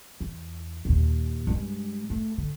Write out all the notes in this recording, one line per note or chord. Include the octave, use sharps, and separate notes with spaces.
E2
D#2 A#2
G2 G#3
A3
D3